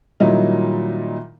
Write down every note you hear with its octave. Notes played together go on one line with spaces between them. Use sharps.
A#2 D#3 F#3 G3 D#4 E4